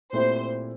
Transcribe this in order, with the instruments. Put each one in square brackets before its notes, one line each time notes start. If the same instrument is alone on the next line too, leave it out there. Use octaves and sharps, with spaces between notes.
[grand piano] A#2 A3 C4 E4 G4 [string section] C5